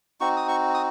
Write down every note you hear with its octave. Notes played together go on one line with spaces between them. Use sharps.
C4 D#4 F#4 C#6
D#6
C#6
D#6